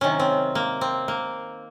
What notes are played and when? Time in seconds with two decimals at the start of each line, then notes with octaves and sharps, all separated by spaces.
0.01 C3 D#3 F#3 C#4
0.20 C4
0.55 A#3
0.81 C4
1.08 A#3